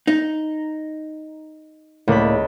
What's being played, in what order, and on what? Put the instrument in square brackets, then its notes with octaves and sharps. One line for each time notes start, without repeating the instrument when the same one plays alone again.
[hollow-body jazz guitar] D#4
[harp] C#2 B5 [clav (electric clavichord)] A2 A#3 D5